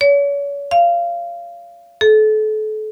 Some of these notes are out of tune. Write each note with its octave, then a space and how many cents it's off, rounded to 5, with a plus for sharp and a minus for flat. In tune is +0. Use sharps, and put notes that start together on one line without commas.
C#5 +35
F5 -20
A4 -35